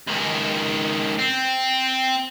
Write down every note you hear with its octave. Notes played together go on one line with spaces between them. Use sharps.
C#2 D#3
C4